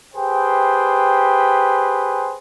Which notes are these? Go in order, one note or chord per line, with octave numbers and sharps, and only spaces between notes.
G4 G#4 B4 C5 G5